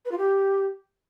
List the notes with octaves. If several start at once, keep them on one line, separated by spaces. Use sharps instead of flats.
B4
F4
G4